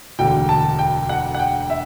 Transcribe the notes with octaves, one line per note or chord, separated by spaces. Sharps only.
E1 D2 D3 G5
A5
G5
F#5
F#5
G5
E5